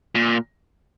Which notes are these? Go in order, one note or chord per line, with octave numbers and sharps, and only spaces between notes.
A#2